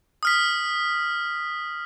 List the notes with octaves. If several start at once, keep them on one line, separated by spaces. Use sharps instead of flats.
D#6 F6 B6